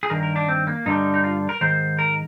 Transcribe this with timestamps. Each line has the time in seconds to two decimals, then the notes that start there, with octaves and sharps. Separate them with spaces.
0.03 G#4
0.10 G2 D#3 A#4
0.23 A#4
0.36 D4
0.48 C4
0.67 A#3
0.86 G2 D3 G3 D#4
1.14 D#4
1.24 F4
1.49 A#4
1.61 G#2 D#3 C5
1.99 A#4